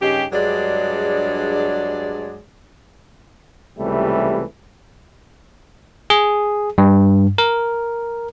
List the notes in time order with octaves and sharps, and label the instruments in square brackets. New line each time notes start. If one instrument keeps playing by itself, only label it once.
[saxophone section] G2 C#3 D#4 G4
G2 F#3 G#3 D4 G#4 D5
[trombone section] C#2 C3 E3 G3 A3
[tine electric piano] G#4
G2
A#4